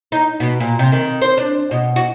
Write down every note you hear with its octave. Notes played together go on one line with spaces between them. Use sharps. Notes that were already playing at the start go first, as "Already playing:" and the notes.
D#4
B2
A#2
C3
D#3
C5
D4
B2
F#4